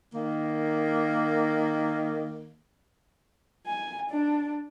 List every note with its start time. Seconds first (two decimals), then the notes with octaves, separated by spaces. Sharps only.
0.14 D#3 A#3
3.67 G#5
4.10 D4